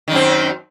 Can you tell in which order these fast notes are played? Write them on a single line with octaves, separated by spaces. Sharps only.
D#3 F#2 C4